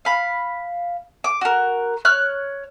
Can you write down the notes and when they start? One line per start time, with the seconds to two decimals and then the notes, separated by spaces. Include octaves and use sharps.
0.05 F5 B5
1.24 D6
1.41 F#4 A#4
2.05 C#5 F6 F#6